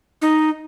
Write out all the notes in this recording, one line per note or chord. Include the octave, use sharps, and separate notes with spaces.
D#4